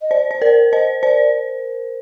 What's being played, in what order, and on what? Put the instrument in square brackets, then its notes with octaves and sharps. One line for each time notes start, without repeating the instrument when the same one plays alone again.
[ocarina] D#5
[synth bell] C5 [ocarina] D5
[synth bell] C5
[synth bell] A#4 [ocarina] D5
[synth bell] C5 [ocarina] D#5
[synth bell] C5 [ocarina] D5